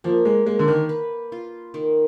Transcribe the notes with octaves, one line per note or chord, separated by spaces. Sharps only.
F3 A#3
G#3
G#3 A#3
D3
D#3
B4
F4
D#3